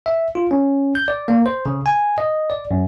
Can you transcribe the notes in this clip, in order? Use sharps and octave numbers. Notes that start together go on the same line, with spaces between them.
E5
F4
C#4
G6
D5
A#3
C5
C#3
G#5
D#5
D5
F#2